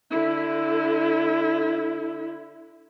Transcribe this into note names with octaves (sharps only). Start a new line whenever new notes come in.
D3 E4